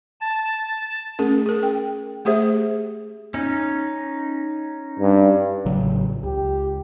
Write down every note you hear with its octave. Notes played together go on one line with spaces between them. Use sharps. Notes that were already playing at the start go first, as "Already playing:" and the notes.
A5
A3 C#4 G#4 A#4
G#4 A#4
G5
A3 G4 G#4 C5 E5
C#4 D#4
G2
A1 C#3 F#3
C#2 G4